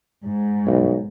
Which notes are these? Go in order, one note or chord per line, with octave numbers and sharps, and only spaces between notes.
G#2
B1